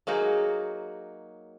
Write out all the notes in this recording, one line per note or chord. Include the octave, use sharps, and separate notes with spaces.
F#3 A#3 D#4 F#4 G#4